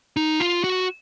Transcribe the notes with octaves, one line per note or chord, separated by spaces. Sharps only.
D#4
F4
F#4